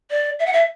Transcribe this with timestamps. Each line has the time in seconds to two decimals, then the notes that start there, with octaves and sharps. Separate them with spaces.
0.11 D5
0.39 E5
0.46 F#5
0.53 E5